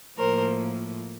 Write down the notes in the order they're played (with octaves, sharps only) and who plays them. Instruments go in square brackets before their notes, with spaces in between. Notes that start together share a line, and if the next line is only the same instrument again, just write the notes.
[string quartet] A2 F3 A#3 A#4 C5